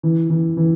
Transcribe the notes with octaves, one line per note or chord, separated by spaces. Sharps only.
E3
E3
E3